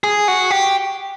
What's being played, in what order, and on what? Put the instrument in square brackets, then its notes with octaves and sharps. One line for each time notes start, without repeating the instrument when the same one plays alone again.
[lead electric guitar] G#4
F#4
G4